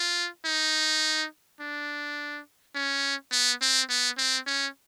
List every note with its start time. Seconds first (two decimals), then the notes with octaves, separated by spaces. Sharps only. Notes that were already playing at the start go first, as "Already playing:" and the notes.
Already playing: F4
0.45 D#4
1.60 D4
2.75 C#4
3.32 B3
3.61 C4
3.89 B3
4.18 C4
4.47 C#4